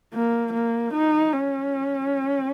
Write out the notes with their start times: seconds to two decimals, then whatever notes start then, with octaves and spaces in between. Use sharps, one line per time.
0.13 A#3
0.53 A#3
0.93 D#4
1.32 C#4